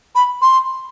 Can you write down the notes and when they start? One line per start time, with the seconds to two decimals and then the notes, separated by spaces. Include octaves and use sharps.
0.15 B5
0.42 C6